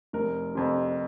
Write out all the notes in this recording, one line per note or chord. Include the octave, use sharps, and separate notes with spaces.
F1 A#4
F2 C3